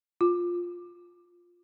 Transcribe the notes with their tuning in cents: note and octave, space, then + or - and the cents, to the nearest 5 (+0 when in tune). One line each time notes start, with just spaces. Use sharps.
F4 +5